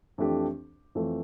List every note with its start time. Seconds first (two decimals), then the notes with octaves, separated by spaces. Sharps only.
0.18 F2 E3 A3 D4 G4
0.95 F2 E3 A3